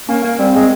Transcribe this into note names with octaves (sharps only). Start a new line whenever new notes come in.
A#3 C#4
A#3
G3 C4
G#3